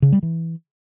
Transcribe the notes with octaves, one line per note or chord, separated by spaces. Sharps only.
C#3
G3
E3